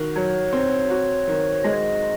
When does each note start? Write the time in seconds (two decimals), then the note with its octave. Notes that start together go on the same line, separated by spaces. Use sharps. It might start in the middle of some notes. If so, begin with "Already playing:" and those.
Already playing: D#3 F#4
0.16 F#3 C#5
0.53 C4
0.90 F#4
1.28 D#3
1.64 G#3 D#5